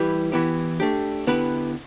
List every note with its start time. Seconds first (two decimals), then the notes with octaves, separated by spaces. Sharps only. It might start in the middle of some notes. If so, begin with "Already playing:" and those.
Already playing: E3 G3 E4 G4 B4
0.32 E3 B3 E4 G4
0.80 A3 D4 G4
1.27 D3 B3 E4 G4 B4